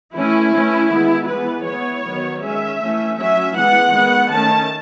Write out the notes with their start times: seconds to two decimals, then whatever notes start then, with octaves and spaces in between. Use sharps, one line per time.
0.14 E3 A3 C#4 E4
0.52 E3 A3 C#4
0.91 D#3 G#3 B3
1.28 E3 G#3 B3 B4
1.65 E3 B3 C#5
2.04 D#3 F#3 B3
2.41 D#3 G#3 C#4 E5
2.79 E3 A3 C#4
3.17 F#3 C#4 E5
3.54 E3 G#3 B3 F#5
3.92 D#3 G#3 B3
4.30 D#3 A3 C#4 A5